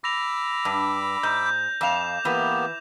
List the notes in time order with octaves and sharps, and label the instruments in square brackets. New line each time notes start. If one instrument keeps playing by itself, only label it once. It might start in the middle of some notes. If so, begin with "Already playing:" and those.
[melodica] B5 D6 E6 [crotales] A#6 F7
[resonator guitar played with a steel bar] G2
[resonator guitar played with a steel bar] G#2 [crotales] G6
[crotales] G6
[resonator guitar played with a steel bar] F2 F5 [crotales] D6 E7 F7
[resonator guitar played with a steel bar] E3 [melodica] A#3 B3 G4